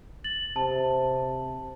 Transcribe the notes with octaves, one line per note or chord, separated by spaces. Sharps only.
A6 F#7
C3 A5